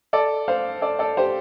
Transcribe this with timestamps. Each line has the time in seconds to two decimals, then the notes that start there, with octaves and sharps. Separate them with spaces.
0.13 A4 D5
0.48 C5 F5
0.81 A4 D5
0.99 A4 D5
1.17 G4 C5